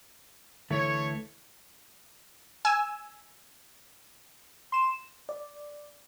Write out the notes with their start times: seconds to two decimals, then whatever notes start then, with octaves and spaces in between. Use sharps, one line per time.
0.70 D2 E3 A3 C#5
2.65 G#5 E6
4.72 C6 E7
5.29 D5